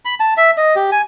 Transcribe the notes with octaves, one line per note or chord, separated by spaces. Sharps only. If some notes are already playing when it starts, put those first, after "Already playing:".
B5
A5
E5
D#5
G4
G#5